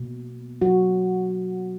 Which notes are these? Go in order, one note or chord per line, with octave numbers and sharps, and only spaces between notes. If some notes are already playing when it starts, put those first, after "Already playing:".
Already playing: B2 A#3
F#3 F#4